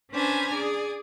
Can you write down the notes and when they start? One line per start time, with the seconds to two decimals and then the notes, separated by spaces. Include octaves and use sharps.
0.12 C#4 D4 B4 C5 G#5 A#5
0.56 G#4 D5